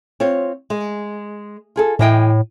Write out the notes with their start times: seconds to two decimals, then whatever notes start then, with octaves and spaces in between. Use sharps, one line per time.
0.20 C4 F4 C#5
0.70 G#3
1.76 F4 G#4 A4
1.99 A2 E3 D#5 G5